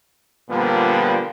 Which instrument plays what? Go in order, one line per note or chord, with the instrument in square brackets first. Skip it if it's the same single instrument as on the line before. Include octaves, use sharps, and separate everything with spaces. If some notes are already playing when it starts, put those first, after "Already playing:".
[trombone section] A#2 D3 F3 G3 A#3 B3